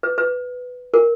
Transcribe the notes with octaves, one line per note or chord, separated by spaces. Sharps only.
B4
B4
A#4